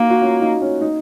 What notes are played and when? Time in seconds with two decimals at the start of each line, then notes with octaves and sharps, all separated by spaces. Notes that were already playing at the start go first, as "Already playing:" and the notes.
Already playing: A#3 D#4 F#4
0.10 F#4
0.22 C#4 F4
0.41 D#4
0.62 C#4
0.81 D#4